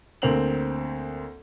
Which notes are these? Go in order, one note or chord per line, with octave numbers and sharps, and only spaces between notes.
D2 A#3 C4 F7 F#7